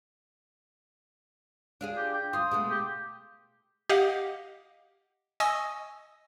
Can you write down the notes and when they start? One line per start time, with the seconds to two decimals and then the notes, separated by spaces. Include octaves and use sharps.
1.81 D4 F4 G#4
1.97 G4
2.13 G5
2.33 D2 F4 D#6
2.51 B2 G#3 A3
2.70 G4
3.89 G4 D#5 F5 F#5
5.40 D#5 G#5 C#6 D#6 E6 A#6